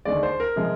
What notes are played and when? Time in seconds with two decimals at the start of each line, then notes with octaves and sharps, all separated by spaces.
0.05 D#2 D3 G#3 D5
0.23 C5
0.40 A#4
0.56 C3 F3 G#3